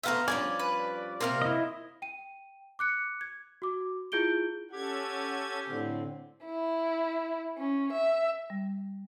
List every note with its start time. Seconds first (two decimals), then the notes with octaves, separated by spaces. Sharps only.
0.03 A3 B3 C5 E5 F5 A#5
0.28 G2 F3 C#4 D5 G#5
0.59 B4
1.21 C3 A#3 C4 A#4 F6
1.42 E4 D#5
2.02 G5 D#7
2.79 D6 F#6 C#7
3.21 G#6
3.62 F#4 D6
4.12 E4 F4 G#4 G6 D7 G7
4.73 C#4 G4 A4 F#5 G#6
5.68 A2 D3 C4
6.45 E4
7.57 C#4
7.92 E5
8.50 G3